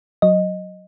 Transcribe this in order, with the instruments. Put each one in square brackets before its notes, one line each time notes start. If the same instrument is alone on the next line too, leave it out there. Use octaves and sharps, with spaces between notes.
[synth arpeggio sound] F#3 D#5